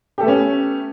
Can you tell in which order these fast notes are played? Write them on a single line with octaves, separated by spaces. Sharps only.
G4 A4 A3 B3 C#4